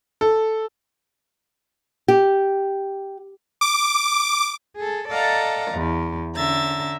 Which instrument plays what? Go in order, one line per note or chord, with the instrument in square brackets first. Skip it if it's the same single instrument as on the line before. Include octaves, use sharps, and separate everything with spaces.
[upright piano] A4
[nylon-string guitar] G4
[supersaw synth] D6
[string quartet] G#4 A4
A4 D5 D#5 F5 F#5 A#5
E2
D3 C#4 E5 A#5 A6